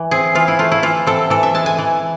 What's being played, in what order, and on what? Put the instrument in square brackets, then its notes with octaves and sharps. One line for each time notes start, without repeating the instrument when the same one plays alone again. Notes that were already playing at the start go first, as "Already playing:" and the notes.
Already playing: [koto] E3
C4 G#4
E3 F4
E4
A3 F4
E4
E3 F4
C4 A4
E3 A4
E5
G#3 A5
G#5
E3